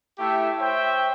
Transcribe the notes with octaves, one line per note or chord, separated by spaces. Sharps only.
A3 E4 G4 E5 G5
C5 C#5 E5 G5